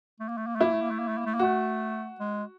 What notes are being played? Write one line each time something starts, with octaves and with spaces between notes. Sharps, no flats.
A3
A#3
A3
A#3
A3
A#3 E4
A3
A#3
A3
A#3
A3
A#3
A3
A#3
A3 F#4
G#3